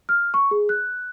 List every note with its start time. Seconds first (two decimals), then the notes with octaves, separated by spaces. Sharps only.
0.09 F6
0.34 C#6
0.51 G#4
0.69 F#6